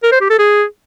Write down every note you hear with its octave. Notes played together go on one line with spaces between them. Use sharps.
A#4
C5
G4
A4
G#4